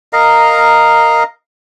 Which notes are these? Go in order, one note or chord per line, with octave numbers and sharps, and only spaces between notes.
A#4 D#5 F5 A#5